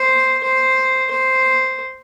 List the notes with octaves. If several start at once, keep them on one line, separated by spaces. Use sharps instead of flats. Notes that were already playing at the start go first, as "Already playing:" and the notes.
Already playing: C5
C5
C5